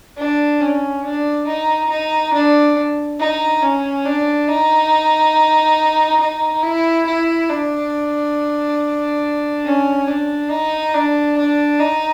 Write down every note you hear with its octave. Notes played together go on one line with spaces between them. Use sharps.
D4
C#4
D4
D#4
D#4
D4
D#4
C#4
D4
D#4
D#4
E4
E4
D4
C#4
D4
D#4
D4
D4
D#4